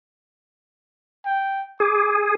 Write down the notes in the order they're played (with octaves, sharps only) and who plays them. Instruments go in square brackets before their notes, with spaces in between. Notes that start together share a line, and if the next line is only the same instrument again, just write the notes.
[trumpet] G5
[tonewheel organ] G#4 [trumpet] D6